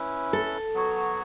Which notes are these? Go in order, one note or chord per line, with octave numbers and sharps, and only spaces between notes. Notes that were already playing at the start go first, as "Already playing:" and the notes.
Already playing: C#4 E4 B4
A4
F#3 B3 F#4 C#5